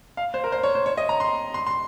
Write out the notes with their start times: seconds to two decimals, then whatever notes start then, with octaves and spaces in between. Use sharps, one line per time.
0.17 F5
0.34 C5
0.44 A#4
0.52 C5
0.63 C#5
0.75 C5
0.86 C#5
0.97 D#5
1.09 A#5
1.20 C6
1.54 C6
1.67 C6